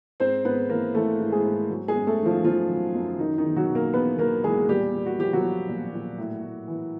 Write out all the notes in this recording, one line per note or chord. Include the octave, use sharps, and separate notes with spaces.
G#2 C4 C5
G#2 B3 B4
E3 A#3 A#4
E3 A3 A4
G#2
G#3 G#4
G#2
F#3
G#3 G#4
F#2
A3 A4
D#3
F3 F4
F#2 F3 F4
F#3
F#2
D#3 F#3 D#4
D#3 D#4
E2
F#3 F#4
B2
A#3 A#4
E2 B3 B4
F#3 A#3 A#4
E2 G#3 G#4
A#2 G3 G4
A#2
F#4
F3 G4
F#3 F#4
F3
A#2
A#2
A2
A2
E3